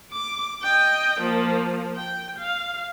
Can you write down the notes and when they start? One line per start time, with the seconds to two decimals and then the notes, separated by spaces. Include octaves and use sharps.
0.12 D6
0.63 D#5 G5
1.20 F3 A#3
1.96 G5
2.39 F5